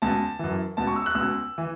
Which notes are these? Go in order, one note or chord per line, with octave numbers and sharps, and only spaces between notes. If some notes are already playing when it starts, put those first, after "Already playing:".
C#2 B2 A5
F#2 E3
C#2 B2 A5
C#6
E6
F#6
C#2 B2 E6
E3